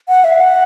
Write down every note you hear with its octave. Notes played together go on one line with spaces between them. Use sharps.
F#5
E5
F#5